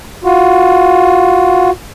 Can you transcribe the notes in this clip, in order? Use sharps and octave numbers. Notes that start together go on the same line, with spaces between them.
F4 F#4